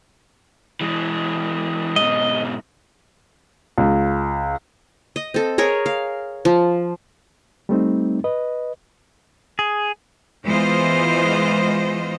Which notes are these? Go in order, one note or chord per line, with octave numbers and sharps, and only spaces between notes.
E3 G#3
G#2 B2 D#5
C#2
D#5
C4 A4
G#4 A#4 C#5
F5
F3
G3 A3 C4 D#4
B4 D#5
G#4
E3 G#3 B3 F4 C5 D#5